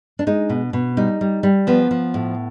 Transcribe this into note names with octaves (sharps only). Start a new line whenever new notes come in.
D4
G#3 D#4
B2
B2
G3 D#4
G3
G3
F3 B3
F3
A2